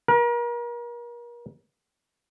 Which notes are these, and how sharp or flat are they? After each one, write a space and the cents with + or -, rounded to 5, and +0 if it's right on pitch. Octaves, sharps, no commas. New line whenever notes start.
A#4 +35